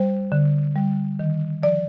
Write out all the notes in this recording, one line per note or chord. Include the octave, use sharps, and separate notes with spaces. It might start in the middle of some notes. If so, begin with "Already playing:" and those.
Already playing: G3 C5
D3
G3
D#3
F3 D5